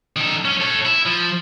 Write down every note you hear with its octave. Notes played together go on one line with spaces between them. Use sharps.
D#3 A4
F#3 C#4
A4 C#5
E4
F3